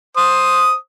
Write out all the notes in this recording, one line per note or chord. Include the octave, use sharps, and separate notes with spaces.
C5 D#6